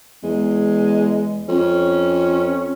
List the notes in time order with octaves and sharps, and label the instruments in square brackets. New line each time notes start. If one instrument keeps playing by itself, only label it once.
[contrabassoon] E2 [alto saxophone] G#3
[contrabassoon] F2 [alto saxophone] C#4